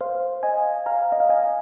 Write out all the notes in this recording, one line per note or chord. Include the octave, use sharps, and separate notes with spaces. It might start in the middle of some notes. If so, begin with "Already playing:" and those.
C5 F5
D#5 G#5
F5 A#5
D#5
F5
D#5 G#5